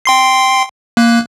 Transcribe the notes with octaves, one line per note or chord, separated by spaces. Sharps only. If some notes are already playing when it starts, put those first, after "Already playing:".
G5 C6 C7
A#3 F#6